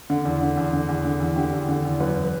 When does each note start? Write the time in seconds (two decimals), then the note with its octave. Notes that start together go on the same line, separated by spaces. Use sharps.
0.10 D3
0.25 E2
0.41 D3
0.57 E2
0.73 D3
0.89 E2
1.05 D3
1.20 E2
1.36 D3 G4
1.53 E2
1.68 D3
1.85 E2
2.00 F#2 B4
2.25 B4